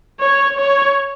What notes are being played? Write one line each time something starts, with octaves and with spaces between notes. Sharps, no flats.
C#5
C#5